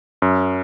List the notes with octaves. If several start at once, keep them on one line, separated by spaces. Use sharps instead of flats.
F#2